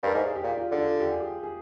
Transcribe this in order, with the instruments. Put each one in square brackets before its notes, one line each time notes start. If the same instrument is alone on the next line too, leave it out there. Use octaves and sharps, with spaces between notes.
[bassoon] G2 [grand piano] A#4
[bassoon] G#2 [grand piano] G#4
[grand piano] G4
[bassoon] A#2
[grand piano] F4
[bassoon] D3
[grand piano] F4
G4
G#4
G4
G#4